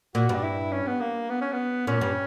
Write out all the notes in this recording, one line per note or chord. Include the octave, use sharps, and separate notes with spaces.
A#2 F#4
G2
D4
E4
C#4
B3
A#3
B3
C#4
B3
A#2 C#4
G2